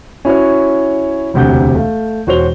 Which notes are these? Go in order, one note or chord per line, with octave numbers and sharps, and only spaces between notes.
C#4 E4 F#4 C#5
E1 D2 C3 F#5 G6
A3 F5
E1 F#4 C5 C#5 F7 G7